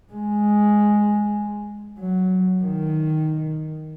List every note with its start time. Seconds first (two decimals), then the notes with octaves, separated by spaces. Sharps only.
0.13 G#3
2.00 F#3
2.63 D#3